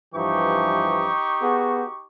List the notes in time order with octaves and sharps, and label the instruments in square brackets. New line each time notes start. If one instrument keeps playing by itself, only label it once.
[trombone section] G2 E3 F3 [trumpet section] D#4 G4 C#6
[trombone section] B3 F#4 G#4